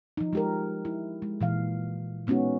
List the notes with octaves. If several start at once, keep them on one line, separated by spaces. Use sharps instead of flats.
F3 D#4
G#3 G4 A#4
E4
G#3
A#2 E3 F5
G#3 B3 C#4 D#4 F#4